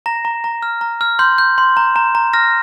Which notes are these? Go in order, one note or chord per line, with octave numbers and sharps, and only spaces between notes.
A#5 A#6
A#5
A#5
F6
A#5
F6
C6 G6
G6
C6
A#5
A#5
A#5
F6 A#6